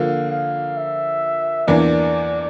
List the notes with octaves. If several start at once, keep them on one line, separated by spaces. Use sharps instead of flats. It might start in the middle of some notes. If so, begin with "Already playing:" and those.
Already playing: D3 F3 A#3 F5
F5
E5
E2 E3 A#3 D4 D5